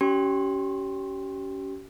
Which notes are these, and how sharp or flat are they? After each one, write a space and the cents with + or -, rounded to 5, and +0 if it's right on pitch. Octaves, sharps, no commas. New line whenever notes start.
C#4 +20 G4 -35 C6 +0